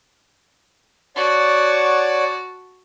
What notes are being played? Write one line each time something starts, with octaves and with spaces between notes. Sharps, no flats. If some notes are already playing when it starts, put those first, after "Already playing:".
F#4 C#5 D5 F#5 A5